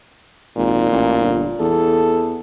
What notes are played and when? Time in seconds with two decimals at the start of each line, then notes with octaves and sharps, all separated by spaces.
0.57 G#1 A#2
0.91 A1
1.20 G1
1.60 E2 A4